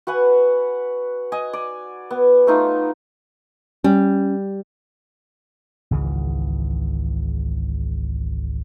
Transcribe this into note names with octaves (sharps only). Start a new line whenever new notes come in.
F#4 B4 F#5 G#5
D#5 G#5
D5
B3
A3 D#4 F4
G3 C#4
G#1 C#2 C#3 E3